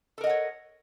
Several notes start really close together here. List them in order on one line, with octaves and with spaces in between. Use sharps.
A4 A#4 D#5 F#5 C#5